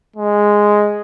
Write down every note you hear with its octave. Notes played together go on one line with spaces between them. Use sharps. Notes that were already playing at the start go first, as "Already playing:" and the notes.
G#3